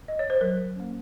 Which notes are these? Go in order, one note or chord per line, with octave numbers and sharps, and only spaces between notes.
D#5
C#5
C5
F#3 A#4
A#3 C#4